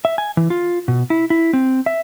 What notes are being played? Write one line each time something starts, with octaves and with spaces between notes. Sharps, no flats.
E5
G#5
E3
F4
B2
E4
E4
C4
E5